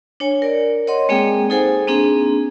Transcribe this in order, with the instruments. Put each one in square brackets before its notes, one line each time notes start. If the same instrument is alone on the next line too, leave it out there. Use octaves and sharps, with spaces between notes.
[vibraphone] D4 C#5 G#5
A#4 D5
C#5 D#5 F#5 C6
G#3 A#3 C4 G#4 G5
D#4 G#4 A4 C5 F#5 G#5
A#3 C4 D4 G#4